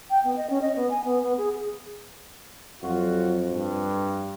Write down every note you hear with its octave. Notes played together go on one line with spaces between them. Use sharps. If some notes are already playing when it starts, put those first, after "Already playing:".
G5
B3
D#5
C#4
D#5
B3
G#5
B3
B3
G#4
G#4
F2 F#3 F4 F#4
G2